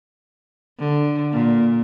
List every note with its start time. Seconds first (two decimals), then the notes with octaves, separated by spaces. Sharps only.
0.79 D3
1.32 A#2